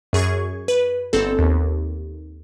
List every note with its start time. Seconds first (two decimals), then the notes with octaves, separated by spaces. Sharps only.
0.13 F#2 G#4 C#6 G#6
0.68 B4
1.13 G1 C4 A4
1.39 D#2